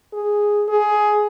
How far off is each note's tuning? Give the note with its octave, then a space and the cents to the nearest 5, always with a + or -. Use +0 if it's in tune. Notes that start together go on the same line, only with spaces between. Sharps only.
G#4 +0
G#4 +15